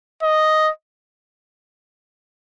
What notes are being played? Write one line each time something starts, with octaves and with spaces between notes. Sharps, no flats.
D#5